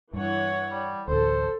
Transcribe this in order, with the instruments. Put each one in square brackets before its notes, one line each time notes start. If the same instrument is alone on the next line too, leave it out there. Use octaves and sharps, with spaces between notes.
[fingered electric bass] G2 [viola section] E3 C#5 F#5
[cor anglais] G3
[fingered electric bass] A1 D2 [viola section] A4 [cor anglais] C5